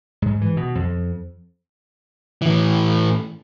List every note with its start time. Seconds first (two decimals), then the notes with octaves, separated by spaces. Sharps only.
0.22 G#2
0.41 E3
0.57 B2
0.75 F2
2.42 A2 E3